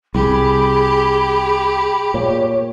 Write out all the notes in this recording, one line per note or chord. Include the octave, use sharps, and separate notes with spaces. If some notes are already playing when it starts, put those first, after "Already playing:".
C2 G4 G#4 B5
A#2 C#5